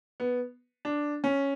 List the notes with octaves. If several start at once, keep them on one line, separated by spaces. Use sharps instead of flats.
B3
D4
C#4